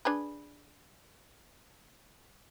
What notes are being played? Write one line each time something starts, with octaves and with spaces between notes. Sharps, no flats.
D4 G#4 B4